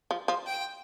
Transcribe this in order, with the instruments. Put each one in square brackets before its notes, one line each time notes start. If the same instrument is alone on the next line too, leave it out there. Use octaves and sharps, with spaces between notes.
[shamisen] F3
F3
[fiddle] G5